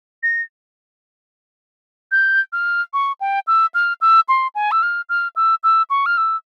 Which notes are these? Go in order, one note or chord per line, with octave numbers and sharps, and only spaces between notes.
A#6
G6
F6
C#6
G5
E6
F6
E6
C6
G#5
E6
F6
F6
E6
E6
C#6
F6
E6